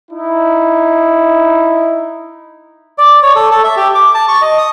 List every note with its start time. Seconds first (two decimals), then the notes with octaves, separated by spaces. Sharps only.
0.11 D#4 E4
2.98 D5
3.23 C#5
3.35 A4
3.51 A4
3.64 E5
3.77 G4
3.95 D6
4.15 A5
4.28 C#6
4.42 D#5
4.58 D#6